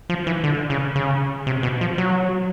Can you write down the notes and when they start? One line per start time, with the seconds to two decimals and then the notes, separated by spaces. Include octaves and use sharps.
0.10 F3
0.27 E3
0.44 D3
0.70 C#3
0.96 C#3
1.47 C3
1.63 B2
1.81 F3
1.98 F#3